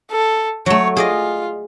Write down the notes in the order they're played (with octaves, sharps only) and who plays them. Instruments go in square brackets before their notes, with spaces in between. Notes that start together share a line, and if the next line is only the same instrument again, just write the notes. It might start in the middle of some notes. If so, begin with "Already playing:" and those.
[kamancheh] A4
[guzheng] F#3 A3 [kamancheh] C#5
[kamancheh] F4 [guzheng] G#4 D5 D#5